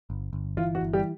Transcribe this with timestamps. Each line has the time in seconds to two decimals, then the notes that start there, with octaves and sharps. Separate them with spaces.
0.10 G1
0.33 G1
0.57 E3 F4
0.75 F#4
0.81 G1
0.93 G3 G4